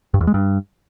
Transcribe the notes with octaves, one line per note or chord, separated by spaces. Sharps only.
G2
E2
G#3
G2